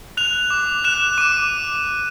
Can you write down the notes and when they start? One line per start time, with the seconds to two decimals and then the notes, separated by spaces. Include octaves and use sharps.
0.17 F#6 F7
0.50 D6
0.84 F#6 E7
1.18 D6 D#7